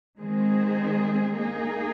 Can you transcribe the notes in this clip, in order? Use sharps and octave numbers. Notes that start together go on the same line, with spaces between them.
D#3 G#3 C4 G#4
A#3 D#4 G#4